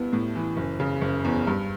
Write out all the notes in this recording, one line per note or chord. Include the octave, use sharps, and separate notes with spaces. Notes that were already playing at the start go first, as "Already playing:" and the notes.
Already playing: G2 B3 E4
A2
E3
F#1
C#3
F#1
E2
G2